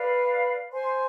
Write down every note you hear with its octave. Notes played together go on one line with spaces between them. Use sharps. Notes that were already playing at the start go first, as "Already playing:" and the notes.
Already playing: B4 D5 F5
C5 G#5 C6